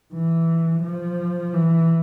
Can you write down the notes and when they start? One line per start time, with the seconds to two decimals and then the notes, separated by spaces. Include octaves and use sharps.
0.13 E3
0.83 F3
1.54 E3